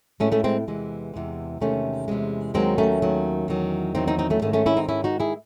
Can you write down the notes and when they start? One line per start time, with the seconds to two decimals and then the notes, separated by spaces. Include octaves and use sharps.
0.20 A2 G#3 A3 C#4
0.32 A3 C#4
0.44 G#3 C4
0.68 E2 C3 E3 G#3
1.14 E2 C3 E3 G#3
1.60 E2 C3 D#3 G#3 A3 C#4
2.08 E2 C3 D#3 G#3
2.54 D#2 D#3 F#3 G#3 C4
2.78 A3 C#4
3.02 D#2 D#3 F#3
3.48 E2 D#3 F#3
3.95 E2 D#3 F#3 C4 D#4
4.07 C4 D#4
4.19 C4 D#4
4.30 A3 C#4
4.42 G#2 D#3 G#3 A3 C#4
4.53 A3 C#4
4.66 C#4 E4
4.77 C4 D#4
4.88 G#2 D#3 G#3 C#4 E4
5.04 D#4 F#4
5.20 E4 G#4